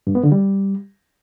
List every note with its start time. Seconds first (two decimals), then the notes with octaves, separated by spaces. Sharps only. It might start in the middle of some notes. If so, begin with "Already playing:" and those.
0.07 G2
0.15 B3
0.23 D3
0.32 G3